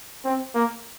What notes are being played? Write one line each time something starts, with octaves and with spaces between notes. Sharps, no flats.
C4
A#3